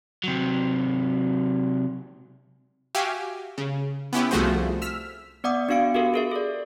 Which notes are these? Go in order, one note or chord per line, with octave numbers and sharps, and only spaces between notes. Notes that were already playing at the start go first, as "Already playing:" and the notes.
C3 F#3
F#4 G4 E5 F5 G#5
C#3
B3 C#4 E4 G4
C2 F3 A3 F#4 G#4 C5
E6 F6 B6
B3 D5 F#5 D6 D#6
B3 D4 F#4 F5 C#7 D7
F#4 G4 A4 A#4
G#4 A#4 E5
A4 D5